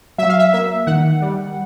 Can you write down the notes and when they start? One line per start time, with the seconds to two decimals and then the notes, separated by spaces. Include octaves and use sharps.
0.18 F#3 E5
0.29 F5
0.39 E5
0.53 A#3 E5
0.87 D#3 F#5
1.22 G3